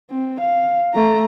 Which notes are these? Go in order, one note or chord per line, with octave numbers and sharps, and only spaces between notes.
C4
F5
A3 A#5